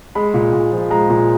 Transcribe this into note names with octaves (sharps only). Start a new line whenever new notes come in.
G#3 B5
A#2
A#2
F3
G#3 A#5
A#2